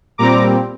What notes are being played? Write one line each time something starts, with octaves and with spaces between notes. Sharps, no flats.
A#2 G3 C4 A#5 D6